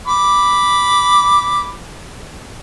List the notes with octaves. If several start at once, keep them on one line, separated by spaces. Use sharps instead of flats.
B5 D6